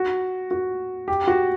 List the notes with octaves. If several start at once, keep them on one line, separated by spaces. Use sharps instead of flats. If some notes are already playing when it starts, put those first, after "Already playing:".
Already playing: F#4
F#4
G4
F#4